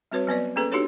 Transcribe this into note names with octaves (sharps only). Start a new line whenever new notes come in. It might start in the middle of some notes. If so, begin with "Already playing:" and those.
G3 C4 F#4 B4 C#5
F#3 B3 B4 D5
A#3 C#4 G#4 A4 B4
D4 D#4 F#4 G4 A4 C#5